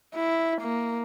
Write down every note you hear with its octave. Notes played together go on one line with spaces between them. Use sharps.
E4
A#3